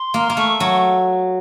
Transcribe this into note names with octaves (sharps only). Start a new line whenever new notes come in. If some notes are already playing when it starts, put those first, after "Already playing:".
Already playing: C6
A#3
A#3
A3 C#6
F#3